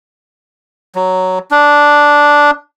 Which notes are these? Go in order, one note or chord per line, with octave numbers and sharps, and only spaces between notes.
F#3
D4